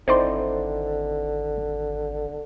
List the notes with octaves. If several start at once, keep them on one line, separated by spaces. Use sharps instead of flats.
G#1 D3 C4 D#4 E4 C5 D5 C6